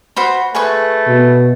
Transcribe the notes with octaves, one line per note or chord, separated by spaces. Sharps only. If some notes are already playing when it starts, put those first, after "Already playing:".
F#4 C5 B5
A3 G#4 B4 C#6
B2